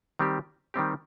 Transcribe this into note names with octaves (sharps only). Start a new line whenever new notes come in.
D#3 G3 C4 G4
D#3 G3 C4 G4